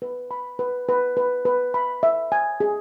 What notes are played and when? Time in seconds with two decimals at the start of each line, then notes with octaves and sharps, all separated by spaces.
0.02 B4
0.31 B5
0.59 B4
0.89 B4
1.17 B4
1.45 B4
1.74 B5
2.03 E5
2.32 G#5
2.60 G#4